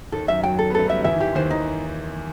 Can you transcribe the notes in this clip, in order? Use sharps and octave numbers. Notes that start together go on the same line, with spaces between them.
D#2 D#3 A4
F#2 F#3 E5
F#2 F#3 G5
A4
B3
A3 A4
G3 E5
F#3
E2 E3 E5
D#3
E2 E3 G4
D#2 D#3 C5
D#3 D#4